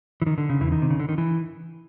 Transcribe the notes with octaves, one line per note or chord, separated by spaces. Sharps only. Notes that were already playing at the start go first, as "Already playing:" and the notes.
E3
D#3
D3
C#3
E2 E3
D#3
C3
C#3
D3
D#3
E3